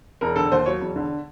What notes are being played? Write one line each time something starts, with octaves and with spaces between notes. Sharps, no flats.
E1 A#4
D3 A4
D#2 C5
F#3 C#5
E1
D3